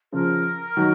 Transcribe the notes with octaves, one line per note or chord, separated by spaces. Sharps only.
C#3 F3 A#4
D#3 F#3